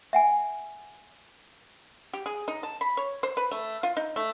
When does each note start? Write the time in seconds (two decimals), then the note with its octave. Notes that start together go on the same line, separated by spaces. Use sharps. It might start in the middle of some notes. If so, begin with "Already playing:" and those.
0.13 E5 F#5 G#5
2.13 G4
2.26 G#4
2.48 D#4
2.63 A5
2.81 B5
2.97 C#5
3.23 C5
3.37 B4
3.51 A3
3.83 F4
3.97 D#4
4.16 A3